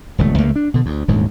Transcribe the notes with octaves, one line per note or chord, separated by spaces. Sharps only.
D#1 C#2 C#3 A3
C#2 A3 A#3
D4
B2 D3
D2
D#1 D2 G#2